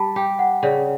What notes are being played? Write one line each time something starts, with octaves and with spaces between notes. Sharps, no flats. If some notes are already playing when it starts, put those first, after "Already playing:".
Already playing: G3 A5 B5
G4 G5
F#5
C#3 D5